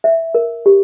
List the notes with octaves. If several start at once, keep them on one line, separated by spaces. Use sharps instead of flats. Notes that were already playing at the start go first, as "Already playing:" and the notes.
E5
A#4
G4